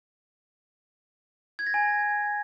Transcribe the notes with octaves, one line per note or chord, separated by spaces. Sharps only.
G#6
A#6
G#5